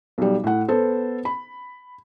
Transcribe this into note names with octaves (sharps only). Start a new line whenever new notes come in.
B1 G3
A2 F#5
B3 A4 C5
B5